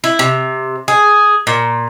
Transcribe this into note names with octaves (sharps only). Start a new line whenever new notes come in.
E4
C3
G#4
A#2